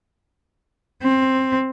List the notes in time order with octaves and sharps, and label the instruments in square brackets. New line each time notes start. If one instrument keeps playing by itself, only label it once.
[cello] C4